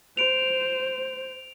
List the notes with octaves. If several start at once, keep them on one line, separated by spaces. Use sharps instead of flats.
C5 D7 F7